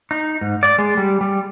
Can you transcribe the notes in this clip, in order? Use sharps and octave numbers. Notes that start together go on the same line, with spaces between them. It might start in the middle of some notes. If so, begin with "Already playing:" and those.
D#4
G#2
D5
G#3
G3
G3